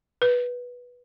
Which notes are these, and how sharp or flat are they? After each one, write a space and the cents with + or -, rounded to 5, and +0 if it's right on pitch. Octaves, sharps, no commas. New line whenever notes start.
B4 -10